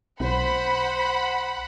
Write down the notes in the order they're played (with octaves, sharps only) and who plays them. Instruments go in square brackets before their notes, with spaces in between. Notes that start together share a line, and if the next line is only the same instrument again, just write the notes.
[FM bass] B1 [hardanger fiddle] C5 [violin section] F#5 B5